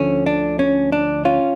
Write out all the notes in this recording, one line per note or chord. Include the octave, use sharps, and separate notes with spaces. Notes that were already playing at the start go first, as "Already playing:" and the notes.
Already playing: D2 D3 F3 A3 C#4
D4
C#4
D4
C#4 F4